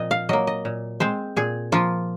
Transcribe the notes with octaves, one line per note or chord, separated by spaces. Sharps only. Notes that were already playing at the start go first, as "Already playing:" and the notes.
Already playing: A#2 F3 C4 D#5
F5
F#3 A#3 D#5
D#5
A#2
G#3 C4 C5
A#2 G#4
F3 A#3 F4